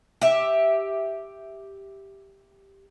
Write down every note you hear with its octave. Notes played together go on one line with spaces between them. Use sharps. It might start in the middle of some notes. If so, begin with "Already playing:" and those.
G4 E5